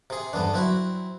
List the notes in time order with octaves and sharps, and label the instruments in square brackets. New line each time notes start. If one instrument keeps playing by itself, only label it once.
[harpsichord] C3 G#4
[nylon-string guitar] E2 G2 [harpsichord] D3 B3 D4
[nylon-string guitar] F#3 [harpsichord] C4 E4 F#4